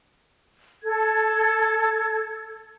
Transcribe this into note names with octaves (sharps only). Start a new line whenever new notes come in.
A4 G#6